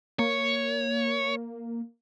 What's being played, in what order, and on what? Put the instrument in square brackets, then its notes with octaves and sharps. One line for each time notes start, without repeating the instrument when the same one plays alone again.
[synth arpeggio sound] A#3 [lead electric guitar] C#5